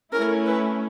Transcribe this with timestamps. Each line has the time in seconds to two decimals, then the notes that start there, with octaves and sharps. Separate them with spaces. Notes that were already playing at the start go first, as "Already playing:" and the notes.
0.12 A3 C#4 E4 A#4
0.46 B4